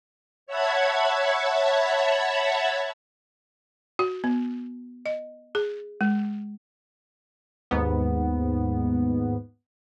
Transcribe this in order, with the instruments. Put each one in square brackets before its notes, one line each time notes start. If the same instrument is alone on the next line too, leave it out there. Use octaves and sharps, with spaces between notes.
[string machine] C#5 E5 F#5 A5 B5 G#6
[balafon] F#4
B3
D#5
G#4
G#3
[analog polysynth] D#2 G#2 B3